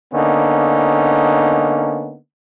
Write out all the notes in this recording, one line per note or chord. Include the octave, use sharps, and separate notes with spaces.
D3 A#3 B3 C#4 D#4